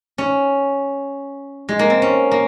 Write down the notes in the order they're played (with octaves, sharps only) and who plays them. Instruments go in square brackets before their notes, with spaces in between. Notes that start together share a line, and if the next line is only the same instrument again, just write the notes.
[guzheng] C#4
G#3
A#3
C4
C#4
A#3